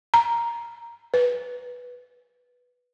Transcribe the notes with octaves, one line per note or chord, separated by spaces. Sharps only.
A#5
B4